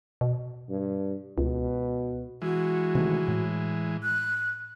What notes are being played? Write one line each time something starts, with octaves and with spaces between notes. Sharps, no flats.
B2
G2
C#2 B2
E3 G#3 F#4
C3 D#3 A3
A2
F#6